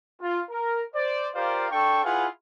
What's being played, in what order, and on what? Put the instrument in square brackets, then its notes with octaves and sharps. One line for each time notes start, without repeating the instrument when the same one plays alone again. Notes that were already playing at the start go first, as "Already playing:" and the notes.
[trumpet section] F4
A#4
C5 D5
F4 G4 A#4 C5 D5 F5
D4 A4 G5 C#6
E4 F4 G#4 B4 F5 F#5